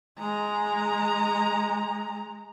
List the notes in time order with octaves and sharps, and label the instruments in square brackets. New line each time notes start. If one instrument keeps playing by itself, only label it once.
[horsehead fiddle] G#3 A#5